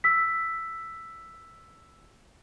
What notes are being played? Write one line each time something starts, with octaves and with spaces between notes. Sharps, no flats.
E6 B6